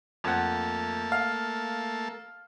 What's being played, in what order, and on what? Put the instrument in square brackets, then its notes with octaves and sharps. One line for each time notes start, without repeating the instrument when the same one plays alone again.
[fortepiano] F2 F#5 [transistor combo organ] A3 A#3 A4
[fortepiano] F5